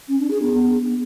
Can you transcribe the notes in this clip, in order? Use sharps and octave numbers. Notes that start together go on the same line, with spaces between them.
C#4
D4
G#4
B3